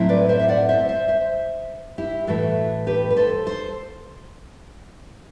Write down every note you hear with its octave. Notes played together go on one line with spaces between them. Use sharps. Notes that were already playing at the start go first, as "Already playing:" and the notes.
Already playing: A2 F#3 C4 E4
B4 D5
C5 E5
E5
D5 F#5
C5 E5
C5 E5
C5 E5
E4 G4
A2 E3 A3 F#4 A4
G4 B4
B4
A4 C5
A4 C5